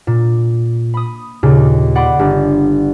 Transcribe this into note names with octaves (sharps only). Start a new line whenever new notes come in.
A#2
B5 D#6
D#2 A#2 C#3
D5 F#5 B5 C6 D6
G1